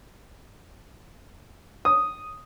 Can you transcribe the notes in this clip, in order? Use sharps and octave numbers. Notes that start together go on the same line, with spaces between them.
D#6